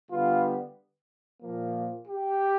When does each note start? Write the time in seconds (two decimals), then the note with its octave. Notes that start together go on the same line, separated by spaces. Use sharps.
0.11 D3 G3 B3 F4
1.41 A#2 F3 A#3
2.07 G4